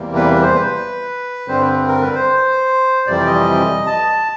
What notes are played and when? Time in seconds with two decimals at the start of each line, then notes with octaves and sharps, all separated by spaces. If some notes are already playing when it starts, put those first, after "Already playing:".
Already playing: E2 C3 E3 G3 A#3
0.15 B4
0.35 B4
0.42 C5
0.55 B4
1.48 G2 D3 G3 C4 C5
1.61 B4
1.88 A#4
2.01 B4
2.15 C5
3.07 F2 C3 E3 G3 D5
3.26 D#5
3.86 A5